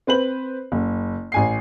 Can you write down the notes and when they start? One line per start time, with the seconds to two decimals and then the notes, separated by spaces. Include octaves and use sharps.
0.07 C4 B4 C5 F#7
0.72 F#1
1.32 A1 G#5 C7